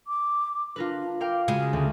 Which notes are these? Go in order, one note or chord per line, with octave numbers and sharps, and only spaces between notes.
D6
D4 F4 A#4 B4
A#4 F5 G5 D6
C#3 G#3 F#4 F6
D2